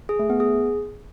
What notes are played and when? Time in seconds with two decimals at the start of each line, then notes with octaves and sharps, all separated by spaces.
0.09 G#4
0.19 A3
0.30 B3
0.40 G#4